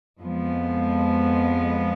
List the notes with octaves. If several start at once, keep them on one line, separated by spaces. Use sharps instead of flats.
F2 F3 G#3 B3